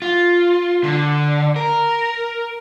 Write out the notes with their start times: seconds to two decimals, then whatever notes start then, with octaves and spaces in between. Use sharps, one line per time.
0.02 F4
0.84 D3
1.56 A#4